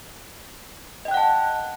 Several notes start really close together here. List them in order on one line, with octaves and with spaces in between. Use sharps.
D#5 G5 F#6 F#5 A5